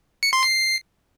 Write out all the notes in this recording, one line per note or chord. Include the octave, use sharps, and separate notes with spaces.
C#7
C6
C7